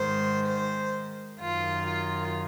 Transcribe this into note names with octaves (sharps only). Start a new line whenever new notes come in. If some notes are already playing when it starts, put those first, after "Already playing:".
Already playing: G#2 D#3 C5
C5
F#2 D#3 F4
F4